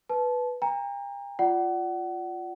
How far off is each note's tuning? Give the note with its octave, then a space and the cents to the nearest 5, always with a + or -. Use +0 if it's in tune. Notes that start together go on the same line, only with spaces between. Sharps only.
B4 +0 A5 -25
G5 +40 A#5 +0
F4 +0 D5 +0 F#5 +30